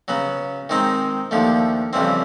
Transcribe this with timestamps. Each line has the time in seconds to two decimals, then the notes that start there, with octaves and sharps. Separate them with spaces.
0.08 C#3 F#3 B3
0.69 D#3 G#3 C4 D#4
1.31 D#2 D3 F3 A3
1.93 F2 C#3 E3 G3 C4